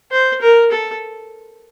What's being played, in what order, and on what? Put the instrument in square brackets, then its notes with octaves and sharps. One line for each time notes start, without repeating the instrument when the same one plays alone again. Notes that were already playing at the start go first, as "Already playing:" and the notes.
[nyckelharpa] C5
A#4
A4